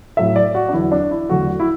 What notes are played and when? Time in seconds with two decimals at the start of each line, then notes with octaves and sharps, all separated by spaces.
0.17 A2 F#3 A3 E5
0.36 D5
0.55 F#4
0.69 D4
0.73 E2 D3 F#3 E4
0.92 D4
1.11 E4
1.29 E2 D3 F#3 A3 F#4
1.48 F#4
1.60 E4